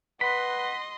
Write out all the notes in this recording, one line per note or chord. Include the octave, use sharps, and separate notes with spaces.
B4 D#5 F#5 B5 C6